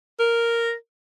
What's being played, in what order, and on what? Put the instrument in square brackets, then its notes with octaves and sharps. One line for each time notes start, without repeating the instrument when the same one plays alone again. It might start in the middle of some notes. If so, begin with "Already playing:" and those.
[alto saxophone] A#4